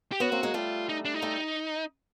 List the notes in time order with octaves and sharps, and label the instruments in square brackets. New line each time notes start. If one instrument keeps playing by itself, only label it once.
[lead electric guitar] G4
[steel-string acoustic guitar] B3 C#4 [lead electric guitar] F#4
[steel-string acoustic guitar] A#3 C4
G#3 A#3
[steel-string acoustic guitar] G3 A3 [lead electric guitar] F4
[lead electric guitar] D#4
D4
D#4
[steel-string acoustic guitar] G3 A3